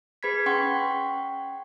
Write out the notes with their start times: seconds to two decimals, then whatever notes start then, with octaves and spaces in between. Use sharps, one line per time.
0.23 G#4 B4 B5 G#6 B6
0.46 C#4 F#5 G5 C6 C#6